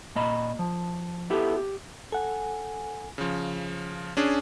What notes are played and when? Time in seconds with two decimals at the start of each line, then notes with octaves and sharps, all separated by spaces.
0.15 A#2 A#3 D#5 B5
0.59 F3
1.30 B3 E4 G4 A4
1.56 G4
2.12 A4 F#5 G#5
3.18 C#3 F3
4.17 C#4 D4 G#4